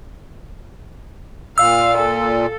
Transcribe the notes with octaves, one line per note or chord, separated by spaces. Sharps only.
A#2 F5 E6
A4